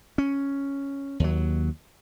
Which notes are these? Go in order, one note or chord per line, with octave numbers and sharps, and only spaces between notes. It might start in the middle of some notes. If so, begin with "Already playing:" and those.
C#4
D#2 F#3